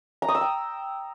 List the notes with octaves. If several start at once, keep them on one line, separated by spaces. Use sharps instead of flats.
A#5
D#6
E6
G5